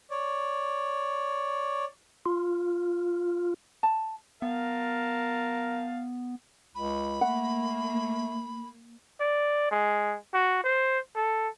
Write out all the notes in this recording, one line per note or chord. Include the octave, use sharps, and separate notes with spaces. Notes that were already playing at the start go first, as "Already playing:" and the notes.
C#5 D5
F4
A5
B3 A#4 F5 A5
C#2 B5
A3 A#3 F#5
D5
G#3
F#4
C5
A4